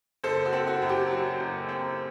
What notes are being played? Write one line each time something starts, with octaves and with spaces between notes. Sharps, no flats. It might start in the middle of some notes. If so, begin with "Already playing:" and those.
F#1 A4 C5
F#4 A4
C4
F#4
F#2
G4
F#3 F#4
F#1
C4